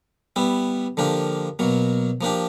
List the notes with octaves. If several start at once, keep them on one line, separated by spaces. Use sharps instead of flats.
G3 B3 E4
D3 F3 A#3 D4 G4
B2 F#3 A#3
F3 A#3 D4 G4